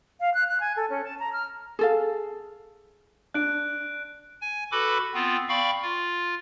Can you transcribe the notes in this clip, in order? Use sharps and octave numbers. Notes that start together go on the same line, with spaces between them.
F5
F#6
F#6
G#5
A4
C#4
A5
A#5
F6
G#4 A4 F5
D4 F#6 D7
G#5
F#4 A4 B4 B5 D6
B3 C4 F4
D5 F5 G5 B5 C#6
F4